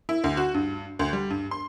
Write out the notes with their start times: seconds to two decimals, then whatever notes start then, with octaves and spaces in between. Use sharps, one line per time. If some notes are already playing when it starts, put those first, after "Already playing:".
0.09 E4
0.24 D2
0.37 F#4
0.54 G2
0.99 D2
1.13 G3
1.30 G2
1.51 C6